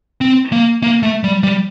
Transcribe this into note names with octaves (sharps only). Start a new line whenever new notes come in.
C4
A#3
A#3
A3
G3
G3